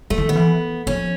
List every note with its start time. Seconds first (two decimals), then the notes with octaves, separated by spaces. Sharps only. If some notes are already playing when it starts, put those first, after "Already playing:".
0.10 F3 A3
0.18 E3
0.27 D#3 B3
0.35 E3
0.87 F3 C#4